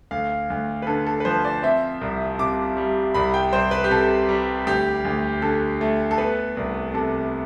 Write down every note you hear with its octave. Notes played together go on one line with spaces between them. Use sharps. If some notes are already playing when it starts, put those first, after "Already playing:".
D2 F5
D2
B4
D3 A4
A4
B4
F3 C5
D5
C4 E5
C2
C3 D6
G3
C2 B5
G5
C2 C5
B4
G4
C3 A4
G3
D2 G4
D2
D3 A4
A3
A4
B3 B4
C2
C3 A4